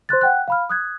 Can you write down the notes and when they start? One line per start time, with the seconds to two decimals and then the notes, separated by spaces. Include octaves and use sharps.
0.09 C5 C6 F#6 A6
0.21 F#5 G5 F#6
0.48 F5 B5 F6
0.70 D#6 F#6 G#6